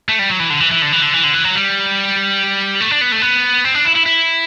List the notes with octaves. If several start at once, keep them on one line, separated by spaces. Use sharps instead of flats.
A3
G3
F#3
E3
D3
E3
E3
D3
E3
D3
E3
D3
E3
F#3
G3
A3
D4
B3
A3
B3
C4
D4
E4
E4
E4